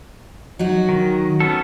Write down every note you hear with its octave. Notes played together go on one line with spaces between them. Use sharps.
F#3 D#4 F#4
D#3
B3 C#4 A4